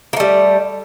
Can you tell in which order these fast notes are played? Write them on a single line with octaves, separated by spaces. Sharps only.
A#3 A3 G3